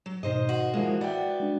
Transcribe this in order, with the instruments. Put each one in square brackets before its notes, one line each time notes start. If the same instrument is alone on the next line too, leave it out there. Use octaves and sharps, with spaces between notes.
[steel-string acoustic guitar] F#3
[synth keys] G#2 B2 [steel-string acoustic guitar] D#3 C5 D#5
[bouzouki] F#4
[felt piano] E3 F3 A#3 [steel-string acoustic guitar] G#3 [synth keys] F#5
[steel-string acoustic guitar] B3 [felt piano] D5 E5 G5
[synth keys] G#3 D4